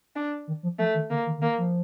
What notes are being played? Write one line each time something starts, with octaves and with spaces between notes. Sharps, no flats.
D4
D#3
F3
F3 A3
D#3
D3 A#3
D#3
D3
D#3 A#3
F3